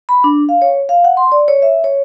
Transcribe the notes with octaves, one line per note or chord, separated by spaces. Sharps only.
B5
D4
F5
C#5
F5
F#5
C6
D5
C#5
E5
C#5